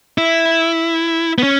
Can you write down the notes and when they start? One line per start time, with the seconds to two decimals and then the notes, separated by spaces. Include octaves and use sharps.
0.18 E4
1.38 B3
1.43 C#4